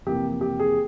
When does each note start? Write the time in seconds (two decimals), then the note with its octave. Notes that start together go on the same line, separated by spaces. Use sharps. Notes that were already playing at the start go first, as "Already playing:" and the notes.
0.06 F2 C3 E3 A#3 G4
0.41 G4
0.60 G#4